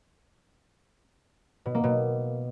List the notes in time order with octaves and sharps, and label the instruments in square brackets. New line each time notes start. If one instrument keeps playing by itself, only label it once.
[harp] B2
A#3
B2